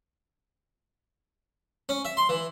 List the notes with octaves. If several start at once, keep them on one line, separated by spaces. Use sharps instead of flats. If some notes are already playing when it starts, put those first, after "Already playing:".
C#4
E5
C6
E3